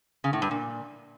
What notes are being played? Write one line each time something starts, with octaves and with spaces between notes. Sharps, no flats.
C#3
A2
G2
A#2